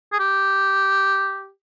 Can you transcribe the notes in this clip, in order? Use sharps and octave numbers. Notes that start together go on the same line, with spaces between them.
G#4
G4